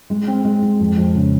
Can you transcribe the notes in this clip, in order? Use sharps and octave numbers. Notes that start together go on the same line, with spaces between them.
G#3
C4
G#3
G#3
F2
F2
C#3